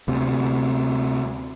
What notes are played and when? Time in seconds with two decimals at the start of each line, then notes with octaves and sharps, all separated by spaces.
0.08 D2 C3